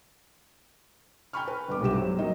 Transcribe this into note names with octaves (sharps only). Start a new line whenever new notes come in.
G5 G#5 A#5 B5 C#6 F6
B4
G1 B3 D6
B1 G2 C3 G4 E7
F#3 C5
F#3 A#3 D#4 D#5